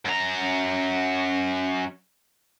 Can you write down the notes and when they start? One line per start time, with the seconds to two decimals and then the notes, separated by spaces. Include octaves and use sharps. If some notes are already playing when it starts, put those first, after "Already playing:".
0.05 F#2 A#5